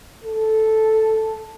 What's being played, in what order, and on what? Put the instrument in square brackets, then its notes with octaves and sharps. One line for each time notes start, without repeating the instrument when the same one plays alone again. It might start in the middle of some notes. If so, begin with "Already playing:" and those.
[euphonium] A4